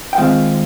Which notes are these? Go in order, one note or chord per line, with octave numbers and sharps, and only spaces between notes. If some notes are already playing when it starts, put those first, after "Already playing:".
G5
D#3 G#3 C4 F4 F5